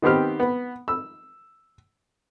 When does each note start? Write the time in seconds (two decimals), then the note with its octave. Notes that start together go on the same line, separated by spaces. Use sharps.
0.02 D#3 B3 C4 G4 F6
0.40 B3
0.88 E6